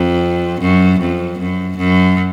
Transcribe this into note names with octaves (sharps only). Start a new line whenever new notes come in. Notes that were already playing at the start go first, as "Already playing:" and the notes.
Already playing: F2
F#2
F2
F#2
F#2